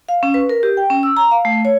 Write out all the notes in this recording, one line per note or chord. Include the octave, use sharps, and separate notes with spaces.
F5
C#4
B4
A#4
G4
G5
C#4
E6
A#5
F5
A3
C#5